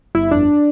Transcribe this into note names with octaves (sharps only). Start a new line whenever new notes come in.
G1 E4
F2 D4